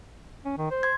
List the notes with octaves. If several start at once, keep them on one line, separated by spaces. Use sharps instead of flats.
C#4
D#3
C5
C6 G#6